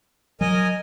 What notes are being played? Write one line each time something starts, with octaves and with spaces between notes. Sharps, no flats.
F#3 A#4 D#5 G#5